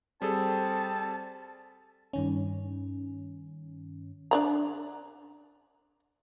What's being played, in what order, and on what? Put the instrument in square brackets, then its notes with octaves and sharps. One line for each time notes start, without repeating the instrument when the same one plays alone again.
[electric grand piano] G3 G#4 A4 [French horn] C4 [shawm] A5
[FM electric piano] G2 D#3 C#4
[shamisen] D4 D5 A#5